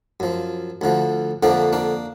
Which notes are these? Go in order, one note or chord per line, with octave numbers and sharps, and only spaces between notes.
F#2 F3
D2 D3 F3
F2 D3 F3 A#3 D4
A#3 D4